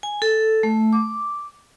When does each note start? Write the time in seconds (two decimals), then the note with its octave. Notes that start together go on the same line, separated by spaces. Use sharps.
0.03 G#5
0.22 A4
0.63 A3
0.93 D6